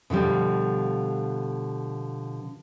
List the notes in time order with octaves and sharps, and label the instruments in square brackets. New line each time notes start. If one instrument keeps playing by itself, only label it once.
[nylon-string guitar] B2 D3 F3 G3